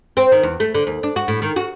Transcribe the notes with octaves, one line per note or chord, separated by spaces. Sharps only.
C4
D#3
E2
A3
D3
D#2
D4
F#4
A2
D#3
F#4